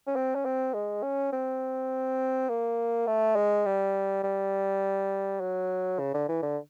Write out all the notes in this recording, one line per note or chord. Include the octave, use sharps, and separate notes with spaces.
C#4
C4
C#4
C4
G#3
C#4
C4
A#3
A3
G#3
G3
G3
F#3
C#3
D3
E3
D3